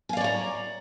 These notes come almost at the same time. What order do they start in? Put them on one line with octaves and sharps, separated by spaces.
G#5 F5 D5 C#5 A#5